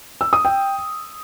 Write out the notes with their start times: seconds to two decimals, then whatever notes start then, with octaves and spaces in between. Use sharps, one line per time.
0.21 E6
0.33 D#6
0.45 G5